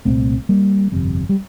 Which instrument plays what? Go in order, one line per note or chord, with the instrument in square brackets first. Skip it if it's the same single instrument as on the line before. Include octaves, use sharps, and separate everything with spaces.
[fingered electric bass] C2 A#2 A3 C4
G3 A#3
G1 F2 C3
G3